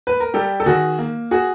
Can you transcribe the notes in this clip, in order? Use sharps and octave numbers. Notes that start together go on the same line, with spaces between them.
B4
A#4
G3 G4 A4
A4
D#3 F#4 G#4
A#3
F#4 G#4